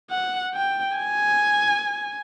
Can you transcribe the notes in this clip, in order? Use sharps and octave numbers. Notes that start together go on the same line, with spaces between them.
F#5
G5
G#5